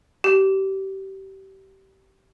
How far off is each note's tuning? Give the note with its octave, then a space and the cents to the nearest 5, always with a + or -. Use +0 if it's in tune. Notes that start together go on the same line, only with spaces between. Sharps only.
G4 -25